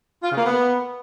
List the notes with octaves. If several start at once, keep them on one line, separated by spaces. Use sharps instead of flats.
F4
C#3
A#3
B3